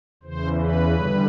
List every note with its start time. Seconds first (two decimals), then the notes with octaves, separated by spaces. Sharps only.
0.22 E2 C#3 E3 C5
0.59 B4
0.95 G2 D3 G3